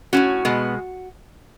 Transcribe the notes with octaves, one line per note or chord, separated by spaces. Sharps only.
A2 G#3 C#4 F#4
B2 G#3 B3